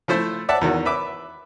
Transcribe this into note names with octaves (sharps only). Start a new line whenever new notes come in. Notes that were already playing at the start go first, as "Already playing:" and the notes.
F3 A3 E4 C5
D5 E5 F#5 A5
E2 D#3 F#4
B4 E5 D6